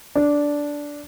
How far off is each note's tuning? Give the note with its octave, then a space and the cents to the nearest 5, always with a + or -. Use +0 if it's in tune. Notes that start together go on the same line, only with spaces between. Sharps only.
D4 -10